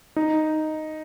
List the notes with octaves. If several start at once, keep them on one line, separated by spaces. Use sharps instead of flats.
D#4